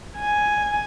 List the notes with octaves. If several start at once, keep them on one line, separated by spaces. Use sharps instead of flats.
G#5